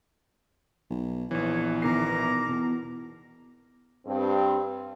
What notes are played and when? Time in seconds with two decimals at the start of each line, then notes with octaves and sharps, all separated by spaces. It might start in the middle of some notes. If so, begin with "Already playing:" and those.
0.91 B1
1.31 A#1 E2 E3 C#5
1.82 B2 D#3 A#4 A#5 D6 C7
2.48 E2 B2
4.06 G2 C4